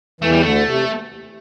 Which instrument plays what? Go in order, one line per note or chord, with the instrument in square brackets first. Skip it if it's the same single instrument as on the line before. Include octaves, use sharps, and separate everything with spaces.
[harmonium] E2 E3 [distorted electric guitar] A3
[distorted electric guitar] G3
[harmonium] D2 D3 [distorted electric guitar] A3
[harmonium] C3